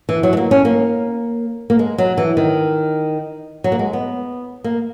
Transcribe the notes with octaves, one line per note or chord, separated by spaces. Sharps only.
E3
F#3
G#3
A#3
C#4
A#3
A#3
G#3
F#3
E3
D#3
F#3
A#3
G#3
B3
A#3